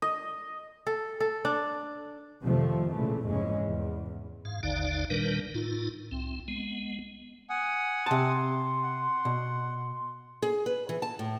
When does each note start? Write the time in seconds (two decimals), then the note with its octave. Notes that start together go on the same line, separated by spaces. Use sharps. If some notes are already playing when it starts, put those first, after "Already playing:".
0.02 D#5
0.87 A4
1.20 A4
1.45 D4
2.43 F2 C3 D#3 F3 A3
2.93 B1 A#2 C#3 E3 A3
3.27 F1 F2 G#2 E3 G#3 C#4
3.63 E2
4.45 G#2 F5
4.63 G#1 D#2 D3 D#4 D5 F5
5.10 A#2 D#3 G3 D4 A#4 B4
5.54 A2 D#4 F4
6.11 C2 C4
6.48 G#3 B3
7.50 F#5 G#5 D#6
8.06 C3 A5 C6
8.83 F#5
9.25 B2
10.42 G#4
10.66 B4
10.89 E3
11.02 A5
11.19 A2